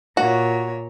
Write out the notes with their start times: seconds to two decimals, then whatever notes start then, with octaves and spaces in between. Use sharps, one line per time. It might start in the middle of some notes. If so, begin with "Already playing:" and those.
0.17 A#2 F#4 C#5